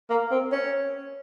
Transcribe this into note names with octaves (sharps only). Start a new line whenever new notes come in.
A#3
C4
C#4